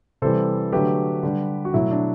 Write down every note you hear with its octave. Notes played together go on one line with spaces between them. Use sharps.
C3 E3 G3 A4 C5
D3 F#3 A3 G4 B4
D3 G3
F#4
B2 F#3 A3 E4
D4